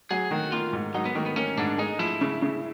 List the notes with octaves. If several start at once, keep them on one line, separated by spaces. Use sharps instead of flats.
F#3 G#4
D#3 F#4
A#3 F4
G#2
F#3 D#4
B3
D#3 A#3
B3
A#3 C#4
G#2 D4
G#3 D#4
F3 E4
C#3
C#3